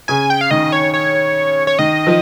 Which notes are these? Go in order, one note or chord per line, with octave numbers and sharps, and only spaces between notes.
C#3 G#5
G5
F5
D#3 D#5
C#5
C#5
C#5
D#3 D#5
F3